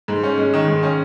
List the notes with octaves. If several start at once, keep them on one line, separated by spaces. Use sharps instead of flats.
G#2
C#4
G#3
D#3
G#2
C#4